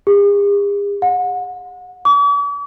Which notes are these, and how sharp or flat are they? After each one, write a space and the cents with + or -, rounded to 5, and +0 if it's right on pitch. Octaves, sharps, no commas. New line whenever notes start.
G#4 -45
F#5 -35
D6 -45